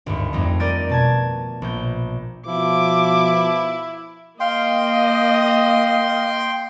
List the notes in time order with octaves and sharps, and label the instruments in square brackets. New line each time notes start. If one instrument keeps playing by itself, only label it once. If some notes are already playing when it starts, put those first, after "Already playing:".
[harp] G#1 D2 G2
F2 G3 A3 D#4
A#4 D5 G6 A6 D#7
B2 A5 G#6
A#1 G6
[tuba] B2 [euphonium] F3 [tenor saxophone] E4 [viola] D6
[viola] A#3 D#5 [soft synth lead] F5 [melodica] G5 C6